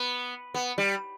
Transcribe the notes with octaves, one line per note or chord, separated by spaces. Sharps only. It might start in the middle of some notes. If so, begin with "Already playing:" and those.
Already playing: B3
B3
G3